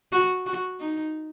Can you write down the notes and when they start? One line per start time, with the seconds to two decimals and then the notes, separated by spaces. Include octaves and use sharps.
0.12 F#4
0.46 F#4
0.80 D#4